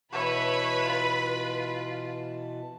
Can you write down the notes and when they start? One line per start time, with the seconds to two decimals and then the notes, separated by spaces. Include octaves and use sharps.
0.12 B2 E3 B4 C#5 E5 A5 B5
0.86 F4